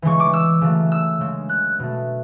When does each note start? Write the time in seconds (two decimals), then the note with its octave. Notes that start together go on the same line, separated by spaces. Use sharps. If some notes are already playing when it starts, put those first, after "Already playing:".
0.02 C#3 E3 G#3 C#6
0.20 D6
0.34 E6
0.61 C#3 F#3 A3
0.92 E6
1.21 C#3 G#3
1.49 F#6
1.79 B2 A3